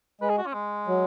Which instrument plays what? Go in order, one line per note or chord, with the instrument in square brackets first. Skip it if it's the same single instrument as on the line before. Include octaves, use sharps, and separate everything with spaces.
[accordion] G#3 [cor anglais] B4
[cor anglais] G#4
F#4
C#4
G#3
[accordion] F#3